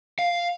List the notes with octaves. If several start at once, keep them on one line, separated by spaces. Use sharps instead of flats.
F5